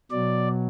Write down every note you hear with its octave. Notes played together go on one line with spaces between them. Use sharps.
B2 F#3 D5